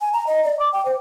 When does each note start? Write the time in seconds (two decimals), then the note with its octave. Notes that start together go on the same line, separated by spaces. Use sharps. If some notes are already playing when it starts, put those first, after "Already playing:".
0.01 G#5
0.13 A#5
0.27 D#5
0.45 D5
0.59 D6
0.73 G5
0.85 C5